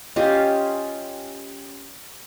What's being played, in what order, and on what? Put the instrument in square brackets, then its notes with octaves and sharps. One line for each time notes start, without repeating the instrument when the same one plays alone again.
[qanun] C#4 F4 G4 D#5